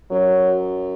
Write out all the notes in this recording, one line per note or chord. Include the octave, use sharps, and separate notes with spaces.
F#2 F#3